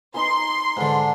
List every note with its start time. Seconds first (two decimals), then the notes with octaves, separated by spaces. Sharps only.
0.14 D#4 B4 G#5 C6
0.77 G#2 D3 B4 A5